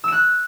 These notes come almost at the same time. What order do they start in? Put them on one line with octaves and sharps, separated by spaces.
E6 E7 F#6